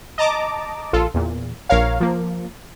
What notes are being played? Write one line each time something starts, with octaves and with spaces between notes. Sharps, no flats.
D#5 A5 A#5 D6
A#1 F4 A4
E2 A#2
A#1 A#4 C#5 F5
F3 A#3